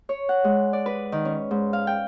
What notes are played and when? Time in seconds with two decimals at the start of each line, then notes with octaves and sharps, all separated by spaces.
0.09 C#5
0.29 F#5
0.44 G#3
0.73 D5
0.86 B4
1.12 D#3
1.25 C#4
1.51 G#2
1.73 F5
1.87 G5